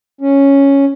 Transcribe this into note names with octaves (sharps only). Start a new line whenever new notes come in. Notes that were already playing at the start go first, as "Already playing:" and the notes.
C#4